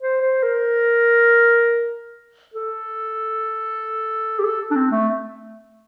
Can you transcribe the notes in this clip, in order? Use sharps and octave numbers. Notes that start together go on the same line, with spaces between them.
C5
C5
A#4
A4
G4
A4
D4
C4
A3